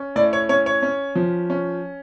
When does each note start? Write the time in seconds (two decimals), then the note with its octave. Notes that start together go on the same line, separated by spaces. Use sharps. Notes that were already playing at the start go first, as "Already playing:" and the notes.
Already playing: C#4
0.16 A2 D5
0.33 C#5
0.49 C#4 C#5
0.66 C#5
0.83 C#4
1.15 F3
1.50 C#4